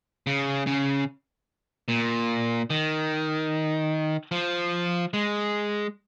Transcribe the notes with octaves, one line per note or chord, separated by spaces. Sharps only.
C#3
C#3
A#2
D#3
F3
G#3